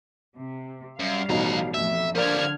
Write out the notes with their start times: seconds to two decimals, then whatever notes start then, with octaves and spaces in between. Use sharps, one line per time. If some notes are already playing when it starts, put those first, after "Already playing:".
0.36 C3
1.00 F#2 G3 F5
1.29 A1 B2 F3 D#4 A#5
1.74 F2 A2 E5
2.15 D3 F3 G3 A#3 D5 F6 G#6